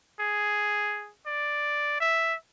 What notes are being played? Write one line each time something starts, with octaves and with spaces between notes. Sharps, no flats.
G#4
D5
E5